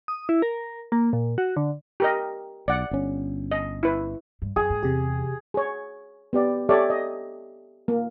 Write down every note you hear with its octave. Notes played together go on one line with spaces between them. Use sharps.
D#6
E4
A#4
A#3
A#2
F#4
D3
G4 A#4 D#5
B1 D5 F#5
G1 C#4
D#5
E4 B4
G2
F#2 G#4
G#2
E2 C3 G4
G#4 C#5
B3 G4 D5
G4 A4 C#5 D5 E5
D#5
A#3